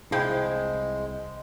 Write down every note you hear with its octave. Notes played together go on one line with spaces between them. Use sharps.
C2 F3 G#3 E4 G#4 F5 G5